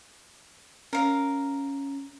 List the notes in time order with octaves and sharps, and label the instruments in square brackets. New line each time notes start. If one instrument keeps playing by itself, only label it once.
[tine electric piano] C#4 [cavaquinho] A#4 F5